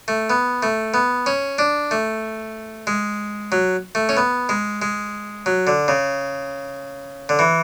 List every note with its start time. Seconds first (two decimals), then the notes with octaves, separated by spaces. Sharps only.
0.08 A3
0.30 B3
0.63 A3
0.94 B3
1.26 C#4
1.58 D4
1.91 A3
2.87 G#3
3.52 F#3
3.95 A3
4.09 C#4
4.17 B3
4.49 G#3
4.82 G#3
5.46 F#3
5.67 D3
5.88 C#3
7.29 D3
7.39 E3